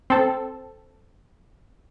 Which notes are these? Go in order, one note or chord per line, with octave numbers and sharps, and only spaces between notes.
C4 A4